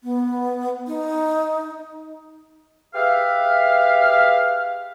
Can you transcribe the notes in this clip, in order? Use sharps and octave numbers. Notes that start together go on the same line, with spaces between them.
B3
D#4
G4 G#4 B4 E5 F5